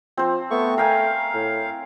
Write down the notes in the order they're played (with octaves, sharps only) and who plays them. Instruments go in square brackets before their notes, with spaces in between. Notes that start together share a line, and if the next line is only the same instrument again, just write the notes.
[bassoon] F3 [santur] C4 C5
[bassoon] A3 [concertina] B3 C#6
[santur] A#4 G5 G#5 [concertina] F5
[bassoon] A2